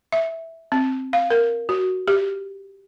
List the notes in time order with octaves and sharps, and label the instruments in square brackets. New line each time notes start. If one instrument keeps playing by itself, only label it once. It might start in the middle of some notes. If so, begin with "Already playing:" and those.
[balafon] E5
C4
F5
A#4
F#4
G4